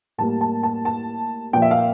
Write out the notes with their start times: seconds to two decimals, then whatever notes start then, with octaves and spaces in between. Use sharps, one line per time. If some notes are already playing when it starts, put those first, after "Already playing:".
0.18 A2 G3 A#3 A5
0.41 A5
0.63 A5
0.85 A5
1.53 A#2 F3 A#3 G5
1.62 E5
1.71 F5